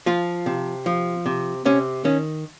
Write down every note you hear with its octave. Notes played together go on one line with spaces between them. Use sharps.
F3 F4
C3
F3
C3
C3 C#4
D#3 C#4